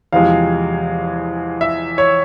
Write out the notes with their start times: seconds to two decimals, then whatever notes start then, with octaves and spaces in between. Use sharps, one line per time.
0.13 E2 C3 F3 G#3 F5
1.61 E5
1.98 C#5